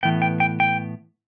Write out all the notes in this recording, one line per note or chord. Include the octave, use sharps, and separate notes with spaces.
A2 E3 B3 G5
G5
G5
G5